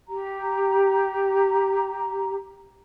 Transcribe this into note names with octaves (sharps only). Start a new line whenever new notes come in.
G4 A#5